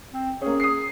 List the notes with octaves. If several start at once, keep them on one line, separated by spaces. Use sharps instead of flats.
C4
A#3 C#4 G#4
D#6 C7